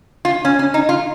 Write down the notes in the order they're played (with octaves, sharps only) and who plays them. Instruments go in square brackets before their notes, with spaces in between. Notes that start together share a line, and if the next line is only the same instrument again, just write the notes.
[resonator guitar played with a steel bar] F4
C#4
C#4
D#4
F4